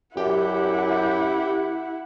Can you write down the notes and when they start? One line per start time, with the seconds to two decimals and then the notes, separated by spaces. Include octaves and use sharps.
0.17 F#2 E4 G4 F#5